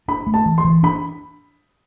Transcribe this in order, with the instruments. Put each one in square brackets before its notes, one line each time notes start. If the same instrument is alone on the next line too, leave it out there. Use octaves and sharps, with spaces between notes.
[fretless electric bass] D4 [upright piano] B5
[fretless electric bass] A3
[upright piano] A5
[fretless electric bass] E3
[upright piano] C6
[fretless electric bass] E3
[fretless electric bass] D4 [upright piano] B5